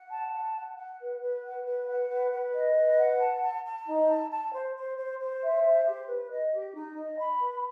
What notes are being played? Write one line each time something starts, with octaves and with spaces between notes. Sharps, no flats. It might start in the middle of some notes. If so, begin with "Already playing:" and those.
Already playing: F#5
A5
F#5
F#5
F#5
B4
B4
F#5
B4
F#5
B4
B4
D#5
B4
F#5
A5
A5
A5
D#4
A5
A5
C5
C5
C5
C5
E5
C5
G4
B4
D#5
G4
D#4
D#5
B5
B4